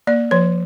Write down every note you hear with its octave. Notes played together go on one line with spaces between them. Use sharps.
A#3 D5
F3 C#5